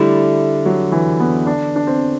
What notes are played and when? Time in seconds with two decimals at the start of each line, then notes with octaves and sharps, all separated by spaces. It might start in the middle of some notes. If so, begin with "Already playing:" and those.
Already playing: D3 G3 A3 E4
0.66 F#3
0.92 E3
1.20 B3
1.47 D4
1.76 D4
1.87 C4